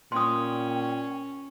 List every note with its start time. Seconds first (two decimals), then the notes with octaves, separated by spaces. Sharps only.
0.12 A#2 C#4 G5 C6 D#6